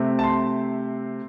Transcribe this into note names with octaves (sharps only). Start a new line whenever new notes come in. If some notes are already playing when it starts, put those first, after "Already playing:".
Already playing: C3 A3 C4
A5
C6